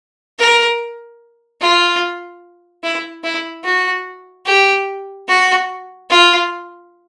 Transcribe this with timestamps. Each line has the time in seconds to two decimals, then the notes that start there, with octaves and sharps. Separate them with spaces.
0.39 A#4
1.61 F4
2.83 E4
3.24 E4
3.64 F#4
4.46 G4
5.28 F#4
6.10 F4